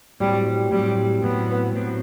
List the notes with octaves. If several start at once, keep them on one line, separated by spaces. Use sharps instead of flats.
A2 F#3 G3 C4
A2 F#3 G3 C4
A2 F#3 B3 C4
A2 F#3 C4